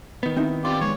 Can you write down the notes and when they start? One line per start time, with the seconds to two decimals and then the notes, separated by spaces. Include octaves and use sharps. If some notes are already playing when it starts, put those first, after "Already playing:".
0.23 D#3 B3
0.36 C4 D#4 E4
0.65 C4 F4 G4 D5 C6
0.81 F3 G#3 A#3 C#5